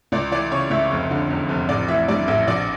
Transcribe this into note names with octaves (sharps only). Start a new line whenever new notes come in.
C#2 D5
E3 D5
C#3 C#5
C#2 E5
F1
D3
E2
F1
A1 D5
E3 E5
G2 D5
A1 E5
A#1 D5